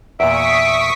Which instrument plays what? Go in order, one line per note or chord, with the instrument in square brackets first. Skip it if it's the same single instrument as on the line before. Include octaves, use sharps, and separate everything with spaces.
[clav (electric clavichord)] E2 A#2 [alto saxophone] E5 [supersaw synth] C#6 D#6 B6 [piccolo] D7